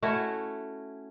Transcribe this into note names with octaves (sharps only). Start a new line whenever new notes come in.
A3 C#4 E4 F#4